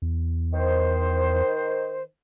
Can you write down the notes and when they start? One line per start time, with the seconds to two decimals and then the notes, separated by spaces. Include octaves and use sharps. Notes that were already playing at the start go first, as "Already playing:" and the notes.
0.02 E2
0.53 D#3 C5